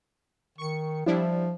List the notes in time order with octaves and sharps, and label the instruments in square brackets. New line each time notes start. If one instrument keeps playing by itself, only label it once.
[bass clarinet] D#3 [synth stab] C#6 C#7
[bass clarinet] F3 [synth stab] G3 D4 E4